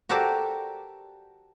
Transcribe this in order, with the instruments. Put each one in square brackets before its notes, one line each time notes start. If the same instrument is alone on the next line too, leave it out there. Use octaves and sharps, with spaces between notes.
[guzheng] F#4 G4 A4 A#4 C5 D5